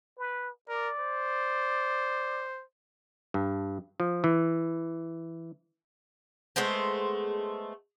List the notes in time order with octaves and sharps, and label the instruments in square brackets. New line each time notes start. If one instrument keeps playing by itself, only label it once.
[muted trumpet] B4
[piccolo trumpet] A#4 [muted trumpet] D5
[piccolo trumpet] C5
[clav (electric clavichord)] G2
F3
E3
[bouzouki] G#3 A3 B3 C5